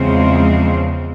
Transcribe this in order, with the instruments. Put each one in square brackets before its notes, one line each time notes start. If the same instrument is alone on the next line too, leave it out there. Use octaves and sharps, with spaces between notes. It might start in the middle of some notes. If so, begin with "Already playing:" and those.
Already playing: [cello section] E2 C#3 F3 G#3 C4